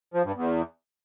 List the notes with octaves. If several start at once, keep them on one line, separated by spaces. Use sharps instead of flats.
F3
G2
E2